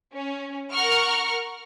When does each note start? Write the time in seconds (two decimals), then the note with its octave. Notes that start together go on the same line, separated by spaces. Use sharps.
0.15 C#4
0.72 A#4 F#5 C#6 F6